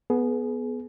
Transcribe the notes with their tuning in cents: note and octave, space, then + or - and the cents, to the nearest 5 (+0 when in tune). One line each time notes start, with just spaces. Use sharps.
B3 +0 G#4 +30